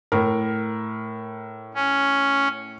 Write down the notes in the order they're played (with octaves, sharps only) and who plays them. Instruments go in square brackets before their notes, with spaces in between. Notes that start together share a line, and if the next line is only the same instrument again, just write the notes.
[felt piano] A2 A#4
[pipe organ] C#4